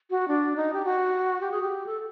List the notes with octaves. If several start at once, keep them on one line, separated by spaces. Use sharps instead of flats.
F#4
D4
D#4
G4
F#4
G4
G#4
G4
A4